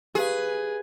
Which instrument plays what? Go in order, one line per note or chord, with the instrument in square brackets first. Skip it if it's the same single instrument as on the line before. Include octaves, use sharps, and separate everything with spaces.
[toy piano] G4 F5 [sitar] G#4 [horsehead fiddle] B4